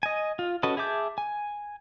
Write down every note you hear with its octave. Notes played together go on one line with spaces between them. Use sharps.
D#5 G#5
F4
C#4 F#4 A4 B4 D#5
G#4 E5 A5 D6 G6
G#5